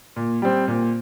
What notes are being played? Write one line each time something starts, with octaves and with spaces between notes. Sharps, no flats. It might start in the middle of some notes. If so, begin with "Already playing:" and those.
A#2
G3 C4
A#2